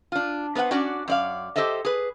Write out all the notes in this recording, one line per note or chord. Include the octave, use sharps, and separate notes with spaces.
D4 F4
B3 B4 C5 F5 F#5
C#4 D4 F#4 D5 F#5
F#2 D5 F5
G4 A4 C5 D#5 E5
G#4 B4